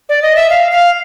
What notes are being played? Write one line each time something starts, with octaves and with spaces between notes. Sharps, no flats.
D5
D#5
E5
F5
F5